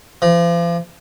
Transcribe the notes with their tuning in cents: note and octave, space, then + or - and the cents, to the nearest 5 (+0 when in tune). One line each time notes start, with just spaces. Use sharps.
F3 -40